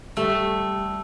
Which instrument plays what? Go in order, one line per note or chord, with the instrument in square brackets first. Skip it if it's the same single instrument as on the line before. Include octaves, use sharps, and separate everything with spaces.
[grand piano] G3 [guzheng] A3